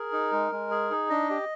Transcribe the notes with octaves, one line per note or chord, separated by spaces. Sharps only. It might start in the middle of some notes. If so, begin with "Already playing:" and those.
Already playing: G#4 A#4
D#4
G#3
G#3
G#4
D#4
D4 D#5
G4